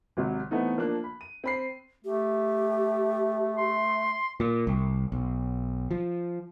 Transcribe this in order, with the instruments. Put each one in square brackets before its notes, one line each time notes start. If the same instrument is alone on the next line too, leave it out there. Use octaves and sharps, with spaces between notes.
[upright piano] G#1 C3 F#3
E3 A3 B3 C4 D#4
F3 A#3 D4 F#6
B5
D#7
C4 B5 C7
[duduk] A3 [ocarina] G4
[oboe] C6
[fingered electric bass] A#2
C2
B1
F3